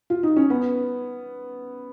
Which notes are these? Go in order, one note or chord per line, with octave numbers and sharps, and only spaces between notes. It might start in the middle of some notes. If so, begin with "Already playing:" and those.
F4
D#4
C#4
B3